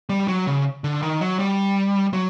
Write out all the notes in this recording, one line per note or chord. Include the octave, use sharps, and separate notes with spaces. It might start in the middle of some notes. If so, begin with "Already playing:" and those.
G3
F#3
C#3
D3
D#3
F#3
G3
F#3